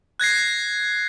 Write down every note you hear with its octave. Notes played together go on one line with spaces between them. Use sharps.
F#6 G#6 A#6 C7